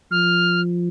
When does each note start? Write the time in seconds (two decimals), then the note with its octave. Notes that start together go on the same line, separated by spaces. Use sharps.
0.11 F3 F6